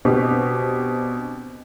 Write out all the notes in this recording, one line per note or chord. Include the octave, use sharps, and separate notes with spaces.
B2 C4 D4 G4